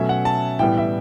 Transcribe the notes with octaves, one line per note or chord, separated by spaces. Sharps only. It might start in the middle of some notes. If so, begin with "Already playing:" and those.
Already playing: B2 F#3 A3 C#4 E5
F#5
A5
A2 E3 G3 B3 G5
E5